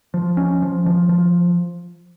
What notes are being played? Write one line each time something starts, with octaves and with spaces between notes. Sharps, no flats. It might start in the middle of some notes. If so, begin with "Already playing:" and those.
F3
C#4
F3
F3
F3